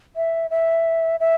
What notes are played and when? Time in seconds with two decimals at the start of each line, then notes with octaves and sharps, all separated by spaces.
0.16 E5
0.50 E5
1.20 E5